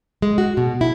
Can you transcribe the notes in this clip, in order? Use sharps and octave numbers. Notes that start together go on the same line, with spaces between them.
G#3
F#4
B2
E4